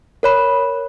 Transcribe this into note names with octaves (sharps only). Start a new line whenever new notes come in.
A#4 C#5 B5